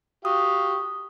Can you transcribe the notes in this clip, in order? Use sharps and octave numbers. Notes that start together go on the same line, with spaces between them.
F#4 G4 F5 D#6